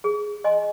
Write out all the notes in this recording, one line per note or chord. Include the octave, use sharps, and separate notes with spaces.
G#4
D#5 G#5 C6